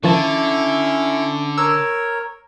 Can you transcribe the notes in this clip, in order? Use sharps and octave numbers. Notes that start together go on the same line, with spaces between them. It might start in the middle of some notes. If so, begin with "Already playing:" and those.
D3 D#3 F3 C#4 E4 A5 C#6
A#4 C#5 E6